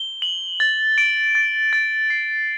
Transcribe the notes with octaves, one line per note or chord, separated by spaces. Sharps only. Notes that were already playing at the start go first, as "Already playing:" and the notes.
Already playing: G7
F#7
A6
D7
A6
A6
C7